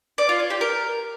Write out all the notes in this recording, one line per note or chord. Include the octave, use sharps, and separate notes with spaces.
D5
F4
C#5
G4
A#4